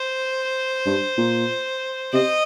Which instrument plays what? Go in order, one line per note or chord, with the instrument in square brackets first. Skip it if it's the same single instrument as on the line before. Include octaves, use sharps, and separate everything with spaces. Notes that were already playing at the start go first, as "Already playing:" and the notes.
Already playing: [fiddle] C5
[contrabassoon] G2
A#2
[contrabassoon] C3 [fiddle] D#5